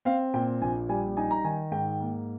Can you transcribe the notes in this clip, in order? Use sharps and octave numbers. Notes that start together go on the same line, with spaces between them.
C4 F5
A#2 G5
A#1 G#5
G3 G#5
D#4 G#5
A#5
D#3 G#5
G#2 G5
A#3